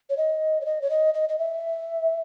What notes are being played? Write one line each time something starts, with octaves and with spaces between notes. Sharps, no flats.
C#5
D#5
C#5
D#5
C#5
D#5
D#5
D#5
E5